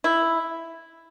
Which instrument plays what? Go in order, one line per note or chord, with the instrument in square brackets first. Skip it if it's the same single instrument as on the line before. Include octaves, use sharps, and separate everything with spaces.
[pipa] E4